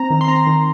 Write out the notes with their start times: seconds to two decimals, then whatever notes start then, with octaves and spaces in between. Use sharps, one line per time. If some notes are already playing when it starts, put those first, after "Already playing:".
Already playing: C4 A#5
0.10 D#3
0.21 C6
0.28 C4 A#5
0.47 D#3